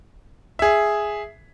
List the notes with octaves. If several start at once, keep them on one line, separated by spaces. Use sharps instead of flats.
G#4 E5